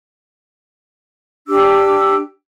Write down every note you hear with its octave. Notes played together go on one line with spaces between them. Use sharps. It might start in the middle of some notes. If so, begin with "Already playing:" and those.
D4 G4 D6 E6